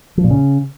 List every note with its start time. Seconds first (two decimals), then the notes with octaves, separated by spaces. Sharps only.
0.17 F3
0.24 A#2
0.30 C#3